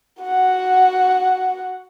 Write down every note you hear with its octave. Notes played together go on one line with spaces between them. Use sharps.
F#4 F#5